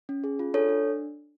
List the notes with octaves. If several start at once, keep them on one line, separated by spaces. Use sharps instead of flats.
C#4
G#4
F4
D4 A4 C#5
D4